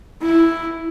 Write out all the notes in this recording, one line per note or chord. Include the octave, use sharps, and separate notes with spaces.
E4